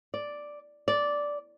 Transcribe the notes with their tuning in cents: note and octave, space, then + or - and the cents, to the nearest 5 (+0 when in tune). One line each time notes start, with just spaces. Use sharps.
D5 +0
D5 -10